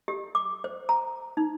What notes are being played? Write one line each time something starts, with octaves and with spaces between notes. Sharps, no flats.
G4
D6
C5
A#5
D#4